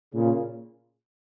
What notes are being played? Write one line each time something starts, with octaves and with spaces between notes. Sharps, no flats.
A#2 C#3